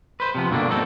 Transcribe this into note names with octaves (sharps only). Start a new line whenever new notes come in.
B4 C5
C3 F3 B3
G2 B2 D3 G3 A#3 D4
A#3 C4 D#4 F#4 A4